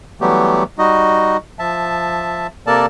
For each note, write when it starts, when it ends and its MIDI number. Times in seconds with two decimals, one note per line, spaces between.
0.21 0.63 52
0.21 0.63 54
0.21 0.63 55
0.21 0.63 57
0.21 0.63 59
0.21 0.63 67
0.78 1.37 55
0.78 1.37 63
0.78 1.37 66
0.78 1.37 75
1.59 2.47 53
1.59 2.47 76
1.59 2.47 81
2.67 2.86 48
2.67 2.86 58
2.67 2.86 69
2.67 2.86 70
2.67 2.86 74
2.67 2.86 81